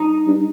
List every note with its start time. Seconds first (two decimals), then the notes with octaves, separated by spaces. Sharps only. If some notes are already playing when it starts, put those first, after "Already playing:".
Already playing: D#4
0.27 G2